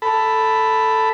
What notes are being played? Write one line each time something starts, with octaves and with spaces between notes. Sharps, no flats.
A4 B5